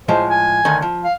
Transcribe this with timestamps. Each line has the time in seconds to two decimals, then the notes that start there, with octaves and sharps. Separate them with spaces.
0.08 A2 F3 G#3 C5
0.30 G#5
0.65 D2 D#3
0.82 F3
1.04 F5